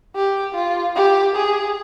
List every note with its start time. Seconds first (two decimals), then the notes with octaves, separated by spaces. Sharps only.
0.15 G4
0.55 F4
0.95 G4
1.36 G#4